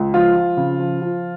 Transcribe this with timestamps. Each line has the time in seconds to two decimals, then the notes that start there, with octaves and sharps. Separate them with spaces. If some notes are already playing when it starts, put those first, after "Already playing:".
Already playing: C#2
0.14 F3 F4
0.35 F3
0.57 C#3
0.79 F3
1.01 F3